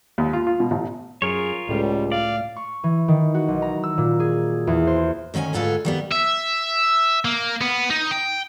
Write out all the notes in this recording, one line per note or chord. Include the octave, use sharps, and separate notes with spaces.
D#2
F4
F4
B2
A1
F#2 F4 G#4 A#4 C#5
C#2 A2 G3
D5 F5
C#6
E3
D#3
F#4
B1
A#5
E6
A#2
G#4
E2
C5
D2 D#3 C#4 D5 G#5
D2 G#2 F4 G#4 A4 B4
D#3 G3 B3
E5
A#3
B3
D#4
G5